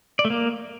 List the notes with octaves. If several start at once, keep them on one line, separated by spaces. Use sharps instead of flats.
D5
A3
A#3